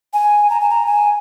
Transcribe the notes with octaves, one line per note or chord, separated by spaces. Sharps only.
G#5
A#5
G#5
A#5
G#5